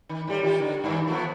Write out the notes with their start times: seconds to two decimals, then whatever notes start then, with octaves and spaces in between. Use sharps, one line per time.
0.09 D#3
0.27 A2 G3
0.43 D#3 F4 G4
0.60 D3
0.84 G2 D#3 E3
1.08 F3 A3 B3